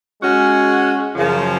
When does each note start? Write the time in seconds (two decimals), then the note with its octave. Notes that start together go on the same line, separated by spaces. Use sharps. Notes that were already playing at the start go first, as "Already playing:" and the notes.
0.22 G#3 C#4 F#4
1.15 F#2 C#3 F3